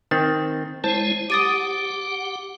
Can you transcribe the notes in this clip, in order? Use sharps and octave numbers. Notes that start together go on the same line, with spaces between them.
D#3 C4 A6
G#3 E4 C5 C#5 A5
G4 F#5 D6 D#6 A6 D#7